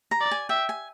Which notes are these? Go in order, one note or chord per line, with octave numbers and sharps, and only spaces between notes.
A#5
D5
G#5
E5 G5
G#5